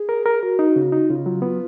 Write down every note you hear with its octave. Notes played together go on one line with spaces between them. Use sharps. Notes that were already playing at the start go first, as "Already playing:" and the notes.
Already playing: G#4
A#4
A#4
F#4 A#4
D#4
C#3
D#4
C#3 F4
F#3
B3